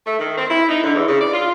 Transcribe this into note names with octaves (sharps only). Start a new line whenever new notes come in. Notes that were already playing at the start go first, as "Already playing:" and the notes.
A3
D#3
C4
E4
D#4
D3
E2
C#3
D5
F4